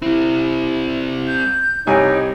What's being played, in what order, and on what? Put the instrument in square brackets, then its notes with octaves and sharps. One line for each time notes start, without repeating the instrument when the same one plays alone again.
[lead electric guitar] G3 C4 [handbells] E4
[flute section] G6
[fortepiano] C2 G#5 [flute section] D#4 C#5 G5 [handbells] G4